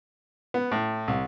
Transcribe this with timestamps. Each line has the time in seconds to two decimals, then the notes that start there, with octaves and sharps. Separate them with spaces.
0.54 B3
0.72 A2
1.08 C2